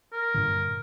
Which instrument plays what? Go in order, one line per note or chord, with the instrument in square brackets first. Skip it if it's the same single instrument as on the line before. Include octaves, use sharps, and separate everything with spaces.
[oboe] A#4
[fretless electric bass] G2 A#2 D3